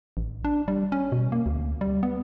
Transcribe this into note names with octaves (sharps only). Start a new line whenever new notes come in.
A1
D4
G3
C#4
B2
A#3
D2
G3
B3